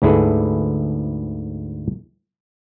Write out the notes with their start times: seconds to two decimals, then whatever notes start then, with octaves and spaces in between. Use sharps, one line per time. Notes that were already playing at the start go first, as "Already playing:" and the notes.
0.02 D2 G#2 E4 G#4 A4 B4